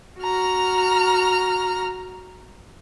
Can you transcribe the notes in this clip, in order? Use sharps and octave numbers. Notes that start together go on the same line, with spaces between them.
F#4 A#5 F6